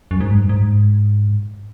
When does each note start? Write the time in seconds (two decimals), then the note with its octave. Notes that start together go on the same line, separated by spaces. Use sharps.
0.11 F#2
0.21 G#2
0.31 G2
0.49 G#2